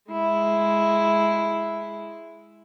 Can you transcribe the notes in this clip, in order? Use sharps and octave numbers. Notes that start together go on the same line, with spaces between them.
G#3 E4